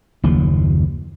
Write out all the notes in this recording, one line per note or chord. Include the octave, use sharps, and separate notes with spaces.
F#1 D#2 F3